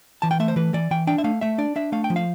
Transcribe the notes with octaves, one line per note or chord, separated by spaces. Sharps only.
E3 A5
G5
A3 E5
C5
E3 B4
E3 D5
E3 G5
D4 G5
E5
A3 F5
A3 E5
D4 D5
D4 E5
A3 F5
G5
F3
F5